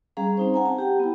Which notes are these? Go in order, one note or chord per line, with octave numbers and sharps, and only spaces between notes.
G3 C#4 G#4 F5 A#5
C4 D#4 C5
F#5 G#5 A#5
A5
G4 G5
B3 E4